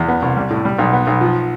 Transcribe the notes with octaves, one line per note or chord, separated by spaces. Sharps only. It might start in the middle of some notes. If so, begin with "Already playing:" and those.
Already playing: E2
B3
C2
G3
A2
G3
B1
B3
B1
F3